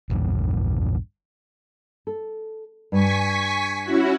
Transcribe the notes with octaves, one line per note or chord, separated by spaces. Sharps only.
A#1 E2 G2
A4
G2 G#5 C#6 B6
C#4 E4 F#4